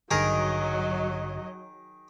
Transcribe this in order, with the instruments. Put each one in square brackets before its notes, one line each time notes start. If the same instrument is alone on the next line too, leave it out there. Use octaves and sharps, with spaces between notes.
[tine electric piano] A1 G2 D3 [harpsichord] D#3 G#4 A#4 [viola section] F#3 D#5